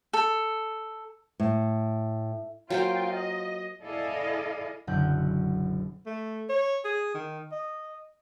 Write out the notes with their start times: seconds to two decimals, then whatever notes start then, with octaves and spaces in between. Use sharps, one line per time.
0.13 A4
1.40 A2
2.70 F#3 A#3 F4 C5 G5
3.12 D#5
3.82 E4 G#4 A4 D5 D#5 F5
4.87 F#1 B1 D3 F#4 F#6 G6
6.06 A3
6.49 C#5
6.84 G#4
7.14 D#3
7.52 D#5